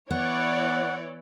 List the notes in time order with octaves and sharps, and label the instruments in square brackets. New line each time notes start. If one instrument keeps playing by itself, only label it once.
[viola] E3 E4 [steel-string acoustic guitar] B3 [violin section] C#5 D5 [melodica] F#5